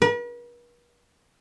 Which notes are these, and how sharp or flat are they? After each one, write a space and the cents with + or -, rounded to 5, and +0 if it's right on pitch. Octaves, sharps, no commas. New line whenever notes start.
B4 -45